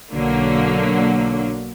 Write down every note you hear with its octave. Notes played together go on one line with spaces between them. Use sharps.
B1 D3 F#3 A#3